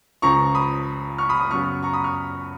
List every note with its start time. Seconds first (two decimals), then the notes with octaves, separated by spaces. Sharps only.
0.22 C#2 C#3 F3 A#5 C#6
0.55 B5 D#6
1.18 C#6 F6
1.29 B5 D#6
1.40 B5 D#6
1.51 F#2 C#3 F#3 B3 C#6 F6
1.83 A#5 C#6
1.93 B5 D#6
2.04 C#6 F6